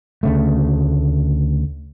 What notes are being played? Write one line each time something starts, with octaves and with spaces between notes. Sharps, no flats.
D2 C#3 A3